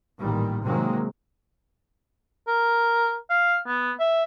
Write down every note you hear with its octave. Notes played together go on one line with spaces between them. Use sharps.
A1 A#2 D#3 G3
C3 D#3 F#3 G#3 A#3 C4
A#4
F5
B3
E5